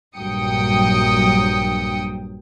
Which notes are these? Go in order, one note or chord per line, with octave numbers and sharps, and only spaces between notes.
A#1 G2 F#3 G5 D#6 C#7